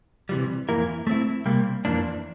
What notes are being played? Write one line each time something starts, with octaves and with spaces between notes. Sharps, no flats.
C3 E3 G3
F2 E3 A#3 E4 A#4
A3 C4 E4
C3 G3 A#3
F2 E3 A#3 D4